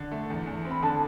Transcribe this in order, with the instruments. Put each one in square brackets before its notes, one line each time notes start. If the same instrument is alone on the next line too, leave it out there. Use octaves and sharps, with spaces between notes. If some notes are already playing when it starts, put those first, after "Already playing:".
Already playing: [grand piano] D3
A3
E2
E2
C4
[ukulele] B5
[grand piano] D3 [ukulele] A4 A5